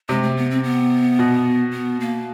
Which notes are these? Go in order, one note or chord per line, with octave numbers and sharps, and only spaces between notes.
C3 G#3
A3
B3
C4
B3
B2
B3
A#3